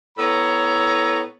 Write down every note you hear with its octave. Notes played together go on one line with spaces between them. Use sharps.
A2 B3 A4 C#5 A#5